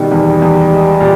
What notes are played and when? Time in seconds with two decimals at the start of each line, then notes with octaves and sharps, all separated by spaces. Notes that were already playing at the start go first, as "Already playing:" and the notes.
Already playing: B2 D#3 G3
0.11 E2
0.42 E2
0.71 G#3
1.01 A#2